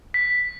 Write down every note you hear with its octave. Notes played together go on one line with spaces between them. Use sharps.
B6